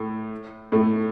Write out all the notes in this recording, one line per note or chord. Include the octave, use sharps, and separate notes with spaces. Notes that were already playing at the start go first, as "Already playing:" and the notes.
Already playing: A2 A3
A2 A3